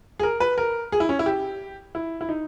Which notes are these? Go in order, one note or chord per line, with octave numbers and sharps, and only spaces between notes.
G#4
A#4
B4
A#4
G#4
E4
C#4
E4
G4
E4
E4
D#4